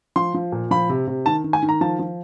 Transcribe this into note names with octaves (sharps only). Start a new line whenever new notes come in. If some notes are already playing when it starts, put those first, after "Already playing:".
F3 C6
F3
A#2
F3 B5
C3
C3
D#3 A5
D#3
G#5
D#3
A#5
F3 A5
F3